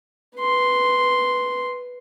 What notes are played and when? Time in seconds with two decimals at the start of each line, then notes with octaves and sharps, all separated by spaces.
0.39 B4 C6